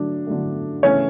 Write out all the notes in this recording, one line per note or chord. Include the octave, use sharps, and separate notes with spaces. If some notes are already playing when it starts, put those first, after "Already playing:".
Already playing: D3 F#3 A3 D4
D3 F#3 A3
C#3 E3 A3 C#4 C#5